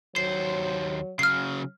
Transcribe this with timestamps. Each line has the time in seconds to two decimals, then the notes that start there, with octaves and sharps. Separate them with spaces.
0.16 D#2 F#3 C5 C7
1.19 C#3 F#3 F6 C7